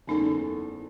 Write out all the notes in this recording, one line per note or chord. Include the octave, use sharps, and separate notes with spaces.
F#1 E2 C#4 D#4 A4 G#5